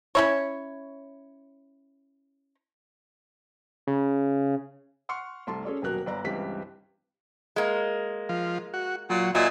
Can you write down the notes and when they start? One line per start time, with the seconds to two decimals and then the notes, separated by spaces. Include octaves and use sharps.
0.15 C#4 E4 C#5
3.87 C#3
5.09 F#5 C6 C#6 F6 C#7
5.47 C2 A3 A5 C6
5.65 C#4 G#4 A4 C#5 D5
5.82 D#1 B2 F#3 A#4 F#6
6.06 G1 D5 A#5
6.24 C#2 G2 E3 C4 G4 B6
7.56 G#3 A#3
8.29 F3
8.74 F#4
9.10 A#2 F#3
9.35 A#2 F#3 D#5 E5 G#5